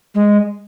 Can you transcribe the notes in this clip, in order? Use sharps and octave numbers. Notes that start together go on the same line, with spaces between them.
G#3